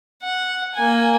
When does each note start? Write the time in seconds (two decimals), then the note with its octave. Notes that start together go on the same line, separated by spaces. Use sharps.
0.23 F#5
0.75 A#3 G#5